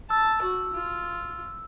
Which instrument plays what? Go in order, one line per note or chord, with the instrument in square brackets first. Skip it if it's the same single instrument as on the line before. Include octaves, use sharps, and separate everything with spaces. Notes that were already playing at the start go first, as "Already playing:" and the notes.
[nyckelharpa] A5 [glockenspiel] E6
[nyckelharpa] F#4
F4